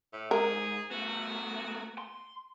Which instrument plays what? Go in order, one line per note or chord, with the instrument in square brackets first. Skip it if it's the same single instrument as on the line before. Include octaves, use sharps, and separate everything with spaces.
[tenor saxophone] A2
[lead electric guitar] G#2 [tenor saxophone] G#4 [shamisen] A#4
[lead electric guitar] A3 B3 [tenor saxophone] F#4
[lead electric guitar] C6